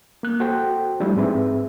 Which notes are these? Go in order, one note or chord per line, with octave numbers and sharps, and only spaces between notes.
A#3 F#6
F#4 A4 C5 G5
F3 G3 A3 D4 E4
G#2 C4 G#4 B4 E5